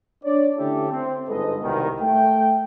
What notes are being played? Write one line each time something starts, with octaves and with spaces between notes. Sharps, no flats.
D4 C#5 D5
D3 A3 C#4 E4 G4 A4
C4
G1 G#2 A4 B4 D#5
C2 B2 D#3
A3 G5